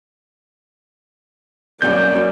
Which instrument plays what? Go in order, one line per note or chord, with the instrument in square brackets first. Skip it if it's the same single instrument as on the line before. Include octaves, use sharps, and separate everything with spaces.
[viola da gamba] F#2 [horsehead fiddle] A#3 D5 [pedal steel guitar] G6